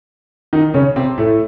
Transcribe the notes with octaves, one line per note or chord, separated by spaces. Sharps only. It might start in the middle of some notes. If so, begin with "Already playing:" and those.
D#3 D#4
C#3 C#4
C3 C4
A2 A3